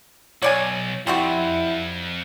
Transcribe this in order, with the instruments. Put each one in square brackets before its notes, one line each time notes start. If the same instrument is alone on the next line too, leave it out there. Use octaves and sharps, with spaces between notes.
[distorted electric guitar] B1 [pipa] C#5 D5 G#5
[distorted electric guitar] F2 [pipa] G3 C4 F#4 [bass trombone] E4